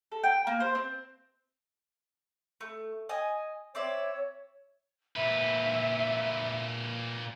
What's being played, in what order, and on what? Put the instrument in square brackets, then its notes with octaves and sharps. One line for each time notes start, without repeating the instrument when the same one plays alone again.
[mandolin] A4
G5
A#3
C5
C4
A3
D#5 G#5
[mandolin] C4 D5 E5 [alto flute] C#5
[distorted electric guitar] A#2 B4 [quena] E5